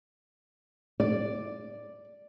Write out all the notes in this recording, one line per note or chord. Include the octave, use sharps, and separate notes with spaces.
D5